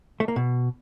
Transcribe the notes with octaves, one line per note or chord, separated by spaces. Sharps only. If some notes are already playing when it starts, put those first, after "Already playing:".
A3
A#3
B2